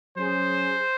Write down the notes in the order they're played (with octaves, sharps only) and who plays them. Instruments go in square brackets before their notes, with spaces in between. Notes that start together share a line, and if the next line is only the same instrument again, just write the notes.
[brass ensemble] F#3 C#4 G#4 [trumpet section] C5